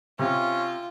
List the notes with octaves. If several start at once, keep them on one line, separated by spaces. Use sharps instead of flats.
C3 C#4 F4